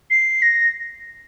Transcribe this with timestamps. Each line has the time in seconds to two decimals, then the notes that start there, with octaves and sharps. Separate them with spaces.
0.11 C7
0.42 A#6